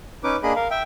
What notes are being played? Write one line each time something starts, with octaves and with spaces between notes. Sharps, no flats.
C#4 D#4 B4 D6
A#3 D4 G#4 D#5 B5
A#4 F5
E5 G5